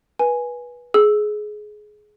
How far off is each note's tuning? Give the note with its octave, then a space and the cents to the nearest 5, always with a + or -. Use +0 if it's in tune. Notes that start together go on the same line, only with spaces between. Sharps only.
B4 -20 G#5 +0
G#4 +20 E6 +0